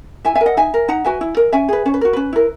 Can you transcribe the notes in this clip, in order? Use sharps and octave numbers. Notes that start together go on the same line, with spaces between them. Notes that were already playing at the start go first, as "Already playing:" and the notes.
E4 E5 G#5
E5 G#5
A#4
D#5 F#5
D#4 E5 G#5
A#4
D#4 F#5 A#5
F#4 B4 E5 G#5
E4
A#4
C#4 E5 G#5
G#4 B4
C#4 C#5
B4
F#4 A#4
C#4 B4
E4 A#4